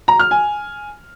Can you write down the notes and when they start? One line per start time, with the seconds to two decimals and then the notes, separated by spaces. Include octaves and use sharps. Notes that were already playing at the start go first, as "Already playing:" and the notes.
0.08 A#5
0.19 F6
0.31 G#5